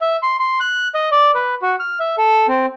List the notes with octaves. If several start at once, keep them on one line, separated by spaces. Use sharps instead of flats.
E5
C6
C6
F#6
D#5
D5
B4
F#4
F6
E5
A4
C4